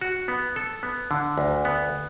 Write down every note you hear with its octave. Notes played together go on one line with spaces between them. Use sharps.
F#4
B3
A4
B3
D3
D2
B3